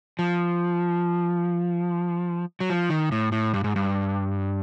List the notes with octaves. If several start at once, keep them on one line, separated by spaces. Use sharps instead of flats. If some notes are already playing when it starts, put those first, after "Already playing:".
F3
F#3
F3
D#3
A2
A2
G2
G#2
G2